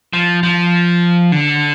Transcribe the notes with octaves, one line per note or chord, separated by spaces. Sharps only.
F3
F3
D3